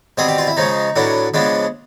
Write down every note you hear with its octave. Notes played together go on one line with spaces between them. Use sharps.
B2 G3 C4 G#4
G4
F4
E4
C#3 F3 G#3 C#4 D#4
A2 F#3 B3 D4
C#3 F3 G#3 B3 D4